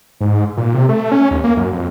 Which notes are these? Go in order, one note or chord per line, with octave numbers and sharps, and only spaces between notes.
G#2
A#2
C3
A3
C#4
D#2
A#3
F#2
F2